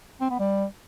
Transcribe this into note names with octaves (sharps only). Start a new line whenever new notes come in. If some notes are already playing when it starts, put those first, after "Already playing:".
C4
B3
G3